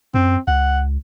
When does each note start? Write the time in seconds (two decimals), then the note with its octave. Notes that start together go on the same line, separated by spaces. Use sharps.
0.14 F#2 C4
0.48 C#2 F#5